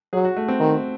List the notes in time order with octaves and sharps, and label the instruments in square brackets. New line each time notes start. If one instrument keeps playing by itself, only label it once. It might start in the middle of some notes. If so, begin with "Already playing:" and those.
[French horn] F#3 [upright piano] G#4
[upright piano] F#4
A3
C4
[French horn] D#3